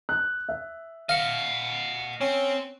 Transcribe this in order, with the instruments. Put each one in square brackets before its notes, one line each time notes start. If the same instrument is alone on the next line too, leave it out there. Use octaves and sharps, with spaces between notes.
[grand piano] F#6
E5
[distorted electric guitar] D#5 F#5 [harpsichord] F5
[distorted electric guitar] C4 [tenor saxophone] C#4